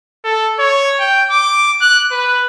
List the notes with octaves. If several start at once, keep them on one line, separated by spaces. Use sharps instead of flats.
A4
C#5
G5
D6
F#6
B4